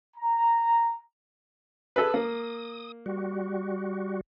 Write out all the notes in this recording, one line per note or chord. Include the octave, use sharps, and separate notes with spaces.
A#5
G#4 A4 B4
A#3 D#6
G3 F#4